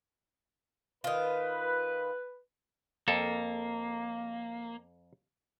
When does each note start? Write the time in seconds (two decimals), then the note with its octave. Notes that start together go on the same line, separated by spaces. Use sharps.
1.04 D#3 F4 B4
3.08 F2 A#3 A4